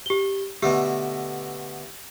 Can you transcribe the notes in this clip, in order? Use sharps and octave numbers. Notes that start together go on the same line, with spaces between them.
G4 G7
B2 D3 A3 G4